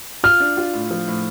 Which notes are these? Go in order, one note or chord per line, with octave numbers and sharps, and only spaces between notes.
F4 F6
D4
F4
A2
F3
A2